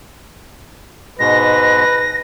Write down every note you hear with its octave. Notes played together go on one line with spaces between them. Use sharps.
G#2 B2 G#3 B4 A#6